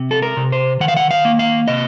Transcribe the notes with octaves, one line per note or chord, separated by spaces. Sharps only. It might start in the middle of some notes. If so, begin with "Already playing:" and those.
Already playing: C3
A4
A#4
C3
C5
D#3 F#5
F5
F#5
F5
A#3
F5
C3 D#5